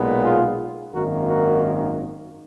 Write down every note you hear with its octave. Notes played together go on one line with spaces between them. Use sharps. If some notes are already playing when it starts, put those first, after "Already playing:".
Already playing: B1 A#2 G#3 B3
F4 G#4
G#1 F#2 D#3 A#3 F#4 A#4
F#4 A#4